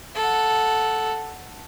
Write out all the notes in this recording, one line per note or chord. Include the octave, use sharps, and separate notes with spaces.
A4 F#5